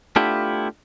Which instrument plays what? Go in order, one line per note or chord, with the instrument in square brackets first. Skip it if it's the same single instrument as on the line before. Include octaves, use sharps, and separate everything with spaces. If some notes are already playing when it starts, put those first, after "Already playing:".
[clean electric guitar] A3 B3 D4 E4 F4 G4